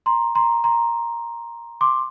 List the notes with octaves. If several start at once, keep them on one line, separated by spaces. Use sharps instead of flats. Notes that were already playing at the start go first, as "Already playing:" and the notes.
A#5 C6
A#5 C6
A#5 C6
C6 D6